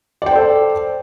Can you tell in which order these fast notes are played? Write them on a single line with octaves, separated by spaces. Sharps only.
D5 G5 C5 A4